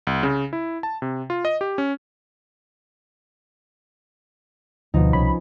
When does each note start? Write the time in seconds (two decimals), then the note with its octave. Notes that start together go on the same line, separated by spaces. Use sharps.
0.07 C2
0.23 C#3
0.53 E4
0.83 A5
1.02 C3
1.30 F4
1.45 D#5
1.61 G4
1.78 C#4
4.94 D2 B2 F3 D#4
5.13 C2 C#4 B5